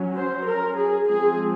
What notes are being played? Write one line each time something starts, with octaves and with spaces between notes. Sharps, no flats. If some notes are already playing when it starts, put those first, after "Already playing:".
Already playing: F#3 C#4
C5
A#4
G#4
F3 G#3 C4 G#4